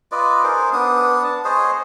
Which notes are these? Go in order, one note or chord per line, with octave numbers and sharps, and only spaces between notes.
F4 B4 D5 D#5
D#4 G#4 A#4 C5
B3 D4 D#6
A5
G#4 C5 C#5 D#5